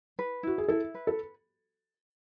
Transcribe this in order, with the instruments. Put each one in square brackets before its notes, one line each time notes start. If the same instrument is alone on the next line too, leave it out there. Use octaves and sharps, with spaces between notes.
[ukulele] B4
[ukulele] E4 [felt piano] F#4
[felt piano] G#4
[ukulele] E4 [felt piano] A4
[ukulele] B4
[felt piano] A4